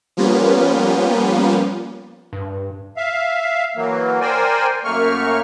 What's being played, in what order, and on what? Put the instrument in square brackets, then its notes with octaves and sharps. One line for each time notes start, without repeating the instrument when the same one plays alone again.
[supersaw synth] F3 G3 A#3 B3 C#4 F4
[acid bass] G2
[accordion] E5 F5
E3 F#3 A#3
A#4 C5 D5 G5 G#5
F#2 A3 A#3 C#6 F6